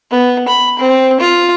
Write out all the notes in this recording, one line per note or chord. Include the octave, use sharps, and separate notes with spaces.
B3
B5
C4
F4